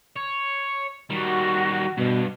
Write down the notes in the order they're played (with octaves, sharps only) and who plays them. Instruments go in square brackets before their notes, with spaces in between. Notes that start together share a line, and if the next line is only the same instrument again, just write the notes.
[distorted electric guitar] C#5
[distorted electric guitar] D#3 G3 [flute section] F#4
[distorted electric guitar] G2 [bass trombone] B2